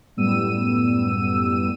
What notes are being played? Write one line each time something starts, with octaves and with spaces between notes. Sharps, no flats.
F#2 A2 G3 B3 E6 D#7